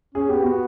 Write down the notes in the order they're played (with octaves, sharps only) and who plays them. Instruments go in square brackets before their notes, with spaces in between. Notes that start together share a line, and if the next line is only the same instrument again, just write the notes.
[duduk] C#4 [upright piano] G#4
[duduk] B3 [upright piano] G4
[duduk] B3 [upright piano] F#4